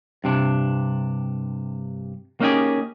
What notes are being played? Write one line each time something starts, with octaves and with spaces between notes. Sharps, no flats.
G2 C3 D4
A#3 C#4 D#4 G4 G#4